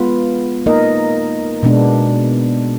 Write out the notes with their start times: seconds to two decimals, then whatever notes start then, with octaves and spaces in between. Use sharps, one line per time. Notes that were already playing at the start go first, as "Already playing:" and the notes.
Already playing: G#3 B3 F4 B4
0.66 A#3 D#4 A#4 D#5
1.63 B2 G#3 B3 D4